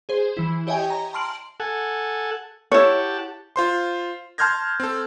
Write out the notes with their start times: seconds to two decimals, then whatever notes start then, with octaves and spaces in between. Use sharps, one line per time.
0.09 G#4 C5
0.37 E3 E4
0.67 G4 C#5 D#5 E5 G5 G#5
0.90 A#5
1.13 A5 A#5 C6 F6 D7 F#7
1.60 A4 F#5 G#5
2.72 E4 G4 C#5 F#5 A5
3.56 F4 C5 C6
4.38 A5 C6 F6 G6 G#6 A#6
4.80 C4 A4